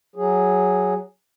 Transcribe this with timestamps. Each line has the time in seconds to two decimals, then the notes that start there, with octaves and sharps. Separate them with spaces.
0.16 F#3 G#4